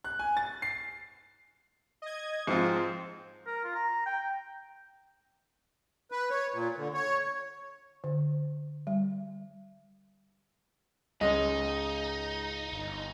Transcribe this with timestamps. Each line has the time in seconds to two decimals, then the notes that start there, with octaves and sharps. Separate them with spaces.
0.04 F#6
0.19 G#5
0.37 A6
0.62 C7
2.02 D#5 G#6
2.47 G#2 F3 C4 F4
3.47 A#4
3.64 F4
3.76 A#5
4.06 G5
6.12 B4
6.30 C#5
6.53 A#2
6.77 D3
6.94 C#5
8.04 D3
8.87 G3
11.21 C#2 G#2 G#3 C#4 D#4 D#5
12.72 G1